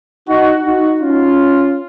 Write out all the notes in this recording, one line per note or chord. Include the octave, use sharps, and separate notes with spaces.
D#4 F#4
D#4 F#4
C#4 F4